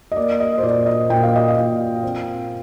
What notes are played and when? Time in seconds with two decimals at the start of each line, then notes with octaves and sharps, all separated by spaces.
0.12 D#5
0.16 A#3 D5
0.40 D#5
0.58 C5
0.63 A#2 D5
0.86 D#5
1.10 A#2 G5
1.23 F5
1.36 D#5
1.48 F5
1.56 A#2
2.03 C4